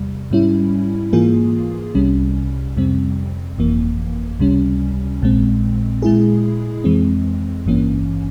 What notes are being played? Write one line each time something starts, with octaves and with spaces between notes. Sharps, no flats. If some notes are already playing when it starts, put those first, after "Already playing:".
Already playing: E2 C3 G3
G#2 G3 C#4 E4
G#2 E3 A#3 F4 G#4
C2 C3 G3 C#4
F2 C3 G3 C4
G1 F2 E3 A#3
C#2 C3 G3 C#4
A#1 A#2 G#3 C4
A#2 G#3 E4 G#4
F2 E3 G#3 C4
G#1 G2 E3 A#3 C#4